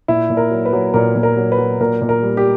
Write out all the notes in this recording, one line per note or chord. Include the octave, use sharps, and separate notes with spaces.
A#2 E4
A#2
A#4
F#3
B4
F#3
A#2 A#4
A#2
A#4
F#3
B4
F#3
A#2 A#4
A#2
A#4
G3
G4